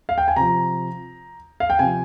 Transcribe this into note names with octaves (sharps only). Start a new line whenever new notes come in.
F5
G5
G#5
C3 F3 A#5
F5
G5
C3 F3 G#5